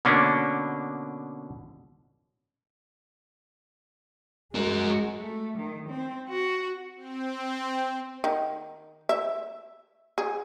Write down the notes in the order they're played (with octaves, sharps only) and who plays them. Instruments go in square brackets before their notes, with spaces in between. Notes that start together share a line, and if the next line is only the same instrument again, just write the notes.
[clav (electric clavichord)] B2 D3 A#3 C#4 D4
[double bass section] G#3 [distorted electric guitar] F#4 A#4
[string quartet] A3
D#3
C4
F#4
[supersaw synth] C4
[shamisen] D#3
E5
G#4